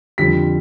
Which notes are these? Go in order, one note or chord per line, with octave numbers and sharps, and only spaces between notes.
F2 D3 G3 B6